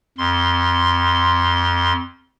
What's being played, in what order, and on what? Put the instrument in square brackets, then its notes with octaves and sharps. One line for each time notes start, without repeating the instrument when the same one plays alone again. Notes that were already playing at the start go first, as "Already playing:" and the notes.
[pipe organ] F2 C6